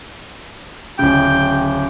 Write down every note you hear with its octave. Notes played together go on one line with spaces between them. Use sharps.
D1 C#3 G5